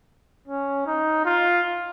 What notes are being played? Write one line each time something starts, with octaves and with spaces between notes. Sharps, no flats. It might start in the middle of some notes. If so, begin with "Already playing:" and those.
C#4
D#4
F4